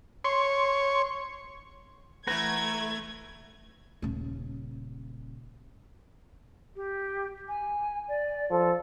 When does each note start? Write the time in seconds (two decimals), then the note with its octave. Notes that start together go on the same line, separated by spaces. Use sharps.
0.24 C#5 C6
2.27 E3 A3 B4 F#5 A#5 G#6
4.02 D#1 C#3
6.76 G4
7.48 G#5
8.08 D5
8.50 F3 A4